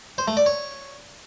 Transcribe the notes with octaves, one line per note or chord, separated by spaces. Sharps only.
C5
A3
D5
C#5